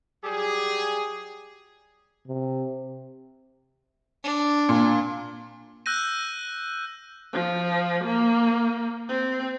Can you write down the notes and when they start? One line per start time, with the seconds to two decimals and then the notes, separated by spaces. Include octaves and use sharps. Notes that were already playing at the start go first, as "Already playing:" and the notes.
0.23 F#3 G3 G4 G#4
2.27 C3
4.24 D4
4.69 A#2
5.86 E6 F#6 G6 A#6 D#7
7.33 F3
8.04 A#3
9.09 C4